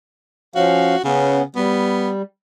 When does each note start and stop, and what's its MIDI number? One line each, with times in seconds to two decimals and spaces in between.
0.55 0.96 53
0.55 0.96 61
0.55 0.99 66
0.55 0.96 77
1.04 1.43 49
1.04 1.42 59
1.04 1.42 61
1.56 2.22 55
1.56 2.10 59